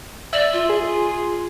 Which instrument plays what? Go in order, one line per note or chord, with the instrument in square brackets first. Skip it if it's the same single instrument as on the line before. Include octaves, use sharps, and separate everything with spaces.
[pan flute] D5 [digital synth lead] E5
[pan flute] F4
[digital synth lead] G#4